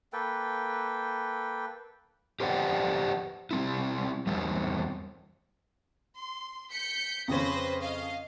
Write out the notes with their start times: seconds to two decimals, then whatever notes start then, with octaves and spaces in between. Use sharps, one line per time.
0.13 A#3 A4 B4 G5
2.40 G4 B4 C5 D5 F#5 G5
3.51 G3 C4 E4
4.27 E2 G3 C4
6.16 C6
6.70 G6 B6 C#7
7.28 F2 C#3 C#4 B4 C5 A#6
7.81 D#5 F5